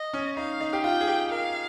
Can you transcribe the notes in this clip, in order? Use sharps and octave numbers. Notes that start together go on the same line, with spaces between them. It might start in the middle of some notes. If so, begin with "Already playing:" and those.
Already playing: D#5
C#4
D#4 F5
D#4
G4
F4 G5
G#4
G4
A#4 F5